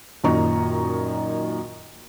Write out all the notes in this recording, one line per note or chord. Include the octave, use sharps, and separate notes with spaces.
F#2 A#2 D#3 D#5 A#5 C#6